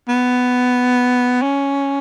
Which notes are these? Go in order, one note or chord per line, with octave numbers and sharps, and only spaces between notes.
B3
C#4